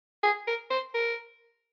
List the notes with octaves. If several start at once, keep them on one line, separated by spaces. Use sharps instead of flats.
G#4
A#4
C5
A#4